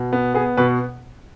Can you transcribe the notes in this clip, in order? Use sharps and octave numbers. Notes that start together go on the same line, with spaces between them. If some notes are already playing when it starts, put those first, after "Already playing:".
Already playing: B2
B3
B3 G#4
B2 B4